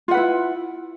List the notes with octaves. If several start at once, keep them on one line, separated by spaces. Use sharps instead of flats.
E4 F4 B4 F#5